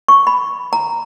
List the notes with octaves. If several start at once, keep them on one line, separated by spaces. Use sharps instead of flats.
C#6
B5
A#5